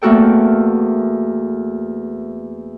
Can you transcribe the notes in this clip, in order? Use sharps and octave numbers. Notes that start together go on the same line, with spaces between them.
E2 A3 A#3 F#4 A4 G5